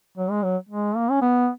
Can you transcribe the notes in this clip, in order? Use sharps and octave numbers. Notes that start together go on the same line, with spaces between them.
F#3
G#3
F#3
G#3
A#3
C#4
B3